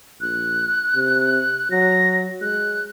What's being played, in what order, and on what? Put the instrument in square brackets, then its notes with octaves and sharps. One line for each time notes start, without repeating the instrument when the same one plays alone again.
[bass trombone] A#1 [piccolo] F#6
[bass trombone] C3
[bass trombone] F#3 [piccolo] A#6
[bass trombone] G#3 [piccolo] F#6